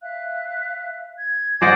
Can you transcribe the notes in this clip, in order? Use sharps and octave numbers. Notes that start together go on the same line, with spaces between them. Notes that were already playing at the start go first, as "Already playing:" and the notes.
E5 F5 F#6
G#6
C5 D5 D#5 F#5 G#5 D6